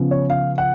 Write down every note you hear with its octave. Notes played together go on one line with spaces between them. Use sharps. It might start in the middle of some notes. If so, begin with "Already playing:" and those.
Already playing: C#3 F3 B3
C#5
F5
F#5